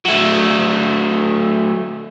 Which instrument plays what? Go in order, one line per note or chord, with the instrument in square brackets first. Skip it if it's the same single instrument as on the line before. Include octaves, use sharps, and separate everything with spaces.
[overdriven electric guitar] F#3 A3